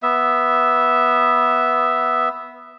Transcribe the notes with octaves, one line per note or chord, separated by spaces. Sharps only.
B3 E5